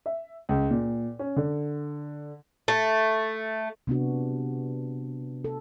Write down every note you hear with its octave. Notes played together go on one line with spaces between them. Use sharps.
E5
C#2
A#2
C#4
D3
A3
C3 B3 D4 F#4
A4